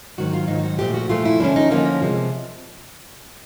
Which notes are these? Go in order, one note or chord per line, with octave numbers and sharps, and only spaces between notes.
G#2 D#3 F#3 F#4
F4
G#2 D#3 F#3 D#4
F#4
A#2 F3 A3 G4
F#4
A#2 F3 A3 F4
E4
D3 F3 A#3 C#4 D4
D#4
D3 F3 A#3 C#4
C3 F3 G#3 C4